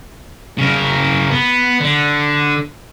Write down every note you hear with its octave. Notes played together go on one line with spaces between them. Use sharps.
C#3 A#4
B3
D3